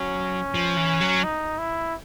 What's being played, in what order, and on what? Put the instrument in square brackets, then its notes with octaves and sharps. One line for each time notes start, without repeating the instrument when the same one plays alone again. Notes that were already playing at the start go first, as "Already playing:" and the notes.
Already playing: [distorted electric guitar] F#3 [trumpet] C#4
[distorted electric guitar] F3
E3
F#3
[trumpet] D#4
E4